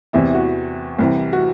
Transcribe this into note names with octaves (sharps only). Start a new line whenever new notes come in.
E2 C3 E3 E4
F#4
C2 C3 E3
F#4